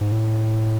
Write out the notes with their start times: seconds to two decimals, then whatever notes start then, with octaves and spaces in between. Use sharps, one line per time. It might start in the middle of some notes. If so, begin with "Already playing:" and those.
0.01 G#2
0.12 A2